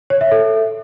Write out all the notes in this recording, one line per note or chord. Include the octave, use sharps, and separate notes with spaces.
C#5
E5
A4